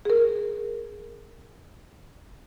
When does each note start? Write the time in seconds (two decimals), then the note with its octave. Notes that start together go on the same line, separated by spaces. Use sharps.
0.05 G#4 A#4